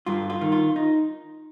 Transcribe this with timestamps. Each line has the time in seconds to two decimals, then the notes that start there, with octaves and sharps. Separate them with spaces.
0.06 G2 F4
0.30 F4
0.41 D#3
0.52 F4
0.76 D#4